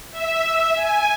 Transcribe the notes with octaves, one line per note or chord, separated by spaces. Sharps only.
E5
G#5